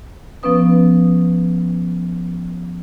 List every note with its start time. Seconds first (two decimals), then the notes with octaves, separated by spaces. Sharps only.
0.43 F3 B3 C#4 B4 D#6